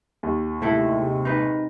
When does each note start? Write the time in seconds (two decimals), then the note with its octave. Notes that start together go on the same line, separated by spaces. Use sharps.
0.23 D#2
0.62 C3 G#3 A3 E4 A4
1.25 D#4 B4